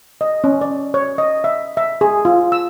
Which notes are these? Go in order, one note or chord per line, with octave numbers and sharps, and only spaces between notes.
D#5
C#4
D5
C#5
D#5
E5
E5
G#4
F4
E6